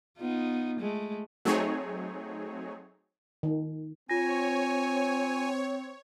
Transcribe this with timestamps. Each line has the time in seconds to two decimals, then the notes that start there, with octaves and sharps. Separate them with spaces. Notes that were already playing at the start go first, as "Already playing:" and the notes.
0.19 B3 D#4 F4
0.79 G#3 A3
1.45 F#3 A3 C4 D#4 G#4 C#5
3.43 D#3
4.10 C4 F4 C#5 G#5 A#6